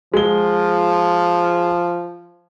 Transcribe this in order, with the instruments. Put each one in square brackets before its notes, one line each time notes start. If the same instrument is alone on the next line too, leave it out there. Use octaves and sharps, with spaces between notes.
[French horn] F3 [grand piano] G#3 G7